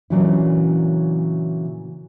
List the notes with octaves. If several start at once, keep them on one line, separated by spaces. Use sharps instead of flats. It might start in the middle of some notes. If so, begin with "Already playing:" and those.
A#2 C#3 E3 F#3 D4 E4